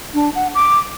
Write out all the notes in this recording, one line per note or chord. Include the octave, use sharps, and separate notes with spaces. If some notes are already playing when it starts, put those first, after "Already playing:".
D4
F#5
D6